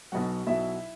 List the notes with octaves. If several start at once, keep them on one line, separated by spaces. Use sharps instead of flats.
B1 B2 F#3 F#4 F#5
B1 B2 F#3 E4 E5